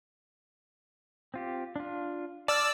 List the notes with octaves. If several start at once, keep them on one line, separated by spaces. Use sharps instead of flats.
C4 F4 G4
D4 F4
D5 A5 E6 F6